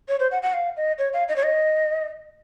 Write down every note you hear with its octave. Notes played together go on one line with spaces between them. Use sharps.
C#5
C5
F#5
F#5
F5
D#5
C#5
F5
D#5
C#5
D#5